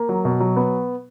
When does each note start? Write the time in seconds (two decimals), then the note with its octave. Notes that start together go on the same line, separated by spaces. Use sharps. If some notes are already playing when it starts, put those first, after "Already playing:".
Already playing: A#3
0.09 F#3
0.25 B2
0.40 F#3
0.56 B3